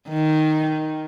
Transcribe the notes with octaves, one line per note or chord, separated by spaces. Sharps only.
D#3